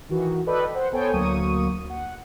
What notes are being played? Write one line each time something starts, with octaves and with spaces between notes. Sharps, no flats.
D#3 E3 F#4
A4 B4 D5 D#5 G5 B5
C5 F#5
B3 A4 C5 C#5 G5 G#5
D2 F#3 A#3 C#6 D#6 D#7
F#5